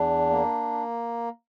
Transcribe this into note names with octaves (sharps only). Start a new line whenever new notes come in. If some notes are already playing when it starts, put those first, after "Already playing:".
Already playing: E2 D4
A#3